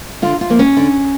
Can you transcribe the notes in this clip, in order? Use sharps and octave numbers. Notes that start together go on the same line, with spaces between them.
D3 F4
F4
F3 A#3
C#4
D3